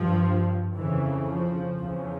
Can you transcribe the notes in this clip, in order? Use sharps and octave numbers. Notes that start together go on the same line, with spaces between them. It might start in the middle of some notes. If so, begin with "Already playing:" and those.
Already playing: G2 F3
F2 C#3 E3
F3
E2 C#3